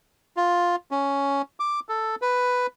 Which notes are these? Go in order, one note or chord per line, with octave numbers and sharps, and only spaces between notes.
F4
C#4
D6
A4
B4